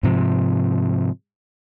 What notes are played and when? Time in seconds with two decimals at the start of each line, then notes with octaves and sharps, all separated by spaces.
0.03 G#2 C3 F3